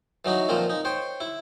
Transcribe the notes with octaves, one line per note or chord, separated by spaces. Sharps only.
E3 F#3 D#4 F#4
A#2 F3 C4 A#4
D#4
C5 C#5 G5
E4